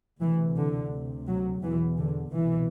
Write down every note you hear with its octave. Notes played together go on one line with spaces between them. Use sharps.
D2 C3 E3
D3
D2 C3
F#3
E2 B2 E3
D3
C2 B2 E3